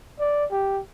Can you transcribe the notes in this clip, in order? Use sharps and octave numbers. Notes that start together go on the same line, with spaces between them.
D5
G4